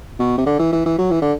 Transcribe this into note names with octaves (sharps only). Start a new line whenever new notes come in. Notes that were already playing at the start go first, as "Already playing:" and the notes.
B2
C3
D3
E3
E3
E3
F#3
E3
D3